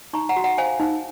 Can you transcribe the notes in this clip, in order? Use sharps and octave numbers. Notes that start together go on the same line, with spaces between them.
D#4 A#5 C#6
F#5 A#5
F#4
F#5 A#5
C5 F5 G#5
D#4